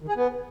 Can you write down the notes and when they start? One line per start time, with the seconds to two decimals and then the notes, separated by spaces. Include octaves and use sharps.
0.01 D#3
0.09 G#4
0.16 B3